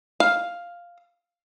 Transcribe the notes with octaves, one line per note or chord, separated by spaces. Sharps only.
F5